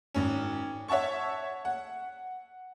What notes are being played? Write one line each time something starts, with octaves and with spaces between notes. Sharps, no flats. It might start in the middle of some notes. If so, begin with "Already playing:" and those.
G#1 C#4
C#5 E5 F#5 A5 C#6
F#5